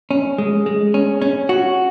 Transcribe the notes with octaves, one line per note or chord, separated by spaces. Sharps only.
C#4
G#3
G#3
C#4
C#4
F#4